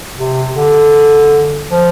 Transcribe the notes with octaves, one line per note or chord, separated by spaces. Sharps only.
C3
D3
F3